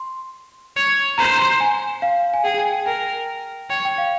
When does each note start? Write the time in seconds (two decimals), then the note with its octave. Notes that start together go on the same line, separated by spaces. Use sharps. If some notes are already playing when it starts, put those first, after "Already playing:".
Already playing: C6
0.76 C#5
1.18 C5 A#5
1.38 C6
1.60 G#5
2.02 F5
2.34 G#5
2.44 G#4 G5
2.58 G#5
2.72 G5
2.86 A#4 G5
3.70 C#5 G5
3.85 G5
3.98 F5